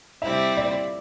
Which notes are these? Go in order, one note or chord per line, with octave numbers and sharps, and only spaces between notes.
C3 G3 C4 E4 E5
D5